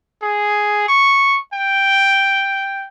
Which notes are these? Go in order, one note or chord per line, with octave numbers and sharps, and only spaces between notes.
G#4
C#6
G5